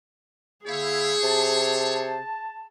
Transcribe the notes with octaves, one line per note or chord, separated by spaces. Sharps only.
D3 A#3 E4 G#4 C5 C#5
C3 A5